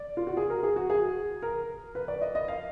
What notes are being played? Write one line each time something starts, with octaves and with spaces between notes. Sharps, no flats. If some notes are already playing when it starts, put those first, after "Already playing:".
Already playing: D5
F4
F#4
G#4
A#4
G#4
F#4
G#4
A#4
B4
D5
D#5
D#5
F5